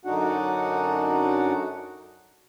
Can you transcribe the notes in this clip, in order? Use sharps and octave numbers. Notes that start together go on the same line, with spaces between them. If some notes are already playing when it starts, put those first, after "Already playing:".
F#2 D3 D4 D#4 F#4 F#5